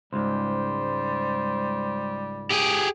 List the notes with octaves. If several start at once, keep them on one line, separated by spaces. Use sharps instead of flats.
C#2 G#2 G3 C5
G4 G#4